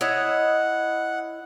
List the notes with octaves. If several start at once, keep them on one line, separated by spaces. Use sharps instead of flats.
E4 C#5 D#5 F#5